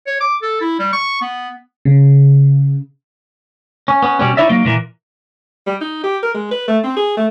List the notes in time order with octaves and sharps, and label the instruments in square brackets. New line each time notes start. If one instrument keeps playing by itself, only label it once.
[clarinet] C#5
D6
A4
E4
G3
C#6
B3
[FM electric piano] C#3
[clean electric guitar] C#4
B3 C#4
B2 G3 C#4
D#4 E4 C#5 D5 E5
F#3 A#3 D#4
A#2 E3 A#3
[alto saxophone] G3
D#4
G4
A#4
G#3
B4
A3
C4
G#4
A3